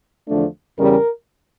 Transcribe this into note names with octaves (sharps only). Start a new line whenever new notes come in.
E2 D3 F3 A3 D4
E2 C#3 G3 C#4 A#4